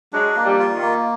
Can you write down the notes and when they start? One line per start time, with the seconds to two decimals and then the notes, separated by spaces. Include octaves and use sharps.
0.13 F#3 G#3 D4
0.36 A#3
0.44 F3 G3
0.59 F4
0.74 D#3
0.82 A#3